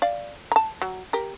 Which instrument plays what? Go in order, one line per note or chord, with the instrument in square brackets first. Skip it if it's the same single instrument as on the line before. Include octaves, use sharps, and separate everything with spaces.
[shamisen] D5 F5
A5 A#5
F#3
G4 A#4